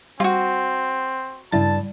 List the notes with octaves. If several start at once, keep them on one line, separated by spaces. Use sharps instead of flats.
G3 C4 F4 F#4
G2 C#3 E4 A5 A6